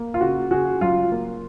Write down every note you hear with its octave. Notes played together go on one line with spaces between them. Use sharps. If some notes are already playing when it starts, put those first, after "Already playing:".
Already playing: A#3
F4
C#3 F#4
C#3 F#4 G#4
F#3 F4
A#3